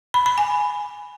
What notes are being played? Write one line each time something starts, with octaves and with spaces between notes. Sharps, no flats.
B5
B5
G#5